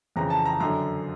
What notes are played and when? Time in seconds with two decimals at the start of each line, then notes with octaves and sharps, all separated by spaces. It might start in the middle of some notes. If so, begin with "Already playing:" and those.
0.16 F2 C#3 E3 A#5
0.30 A5
0.45 A#5
0.60 F#2 D3 A#5